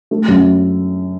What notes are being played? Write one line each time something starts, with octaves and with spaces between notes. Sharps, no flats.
A3
F#2